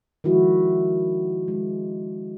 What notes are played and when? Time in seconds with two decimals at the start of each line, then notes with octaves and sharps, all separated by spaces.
0.24 D#3 F3 G#3 E4 F#4
1.48 G#3